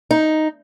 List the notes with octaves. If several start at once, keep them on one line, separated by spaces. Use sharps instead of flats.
D#4